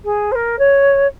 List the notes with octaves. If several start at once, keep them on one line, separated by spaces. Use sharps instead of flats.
G#4
C5
A#4
C#5